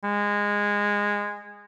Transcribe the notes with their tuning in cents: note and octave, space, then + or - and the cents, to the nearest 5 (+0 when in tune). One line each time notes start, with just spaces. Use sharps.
G#3 -15